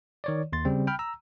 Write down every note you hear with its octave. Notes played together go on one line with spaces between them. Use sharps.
D#3 C#5 D5
D#2 C6 A6
C#3 G3 C4
G5 B5 F6
A#5 E6